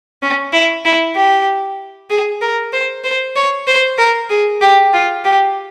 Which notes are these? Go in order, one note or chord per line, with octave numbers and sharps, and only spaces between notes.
C#4
E4
E4
G4
G#4
A#4
C5
C5
C#5
C5
A#4
G#4
G4
F4
G4